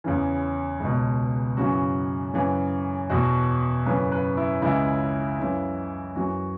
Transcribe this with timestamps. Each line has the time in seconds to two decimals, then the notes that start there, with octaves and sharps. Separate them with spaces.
0.04 E2 C#3 E3 C#4
0.80 C#2 B2
1.57 F#2 C#3 E3 F#4
2.34 F#2 C#3 E3
3.10 E2 B2 F#4
3.86 F#2 C#3 E3 B4
4.12 B4
4.37 E4
4.62 C#2 C#3 E3 E4
5.39 F#2 C#3 E3
6.16 F#2 E3 F#4